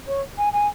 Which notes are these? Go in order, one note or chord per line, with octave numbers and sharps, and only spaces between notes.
C#5
G#5
G#5